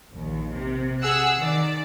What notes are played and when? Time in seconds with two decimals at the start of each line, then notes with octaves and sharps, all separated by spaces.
0.13 A#1 D#2
0.53 C3
1.02 G#4 F#5 E6 F#6
1.39 D#3 D5